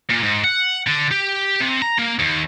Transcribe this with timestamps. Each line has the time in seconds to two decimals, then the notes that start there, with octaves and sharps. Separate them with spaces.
0.10 A#2
0.23 G#2
0.44 F#5
0.87 D3
1.11 G4
1.60 C3
1.82 A#5
1.98 A#3
2.19 D#2